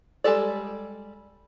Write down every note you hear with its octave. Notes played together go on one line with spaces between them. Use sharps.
G3 G#3 G4 A4 D5